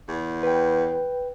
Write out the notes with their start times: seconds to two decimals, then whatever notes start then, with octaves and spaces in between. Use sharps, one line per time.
0.09 E2
0.43 B4 G5